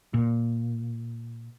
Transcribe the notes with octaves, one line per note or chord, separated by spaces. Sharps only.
A#2